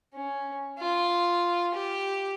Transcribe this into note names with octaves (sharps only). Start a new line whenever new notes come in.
C#4
F4
G4